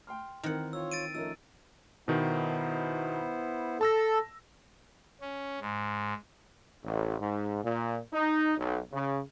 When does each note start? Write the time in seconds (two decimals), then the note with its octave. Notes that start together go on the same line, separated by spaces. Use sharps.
0.07 G5 C6 F6
0.43 D#3 E3 C4 A#4 F#5
0.73 F4 C#5 E6
0.92 A6 D7 D#7
1.15 F3 A3 C#4 D#4 A#4 E6
2.08 B2 D#3 B3 D#4 E4 C5
3.81 A4 A5 E6 A#6
5.21 C#4
5.61 G#2
6.84 A1
7.19 G#2
7.64 A#2
8.13 D#4
8.58 B1
8.92 C#3